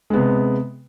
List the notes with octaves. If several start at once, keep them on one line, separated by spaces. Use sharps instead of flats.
C3 G#3 B3